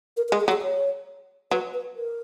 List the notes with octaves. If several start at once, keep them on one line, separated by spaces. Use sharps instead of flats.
A#4
A#4
G#3
G#4
F#3
G#4
C#5
F#3 B4
B4
A#4